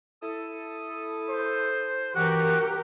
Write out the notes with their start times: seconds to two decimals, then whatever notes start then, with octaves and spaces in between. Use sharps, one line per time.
0.22 E4 A4 D#6
1.29 C5
2.15 G2 E3 F#4 G4 A#4 F#5